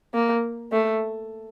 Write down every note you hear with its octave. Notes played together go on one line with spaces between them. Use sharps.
A#3
A3